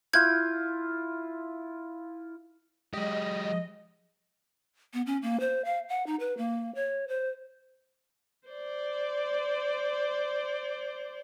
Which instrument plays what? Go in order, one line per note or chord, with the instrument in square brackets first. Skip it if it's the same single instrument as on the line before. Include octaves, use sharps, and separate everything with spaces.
[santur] E4 F4 [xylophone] G6 G#6
[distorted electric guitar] F#3 G4 [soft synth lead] G#3 [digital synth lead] D#5
[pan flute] B3
C#4
A#3
C5
F5
F#5
D#4
B4
A#3
C#5
C5
[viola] C5 D5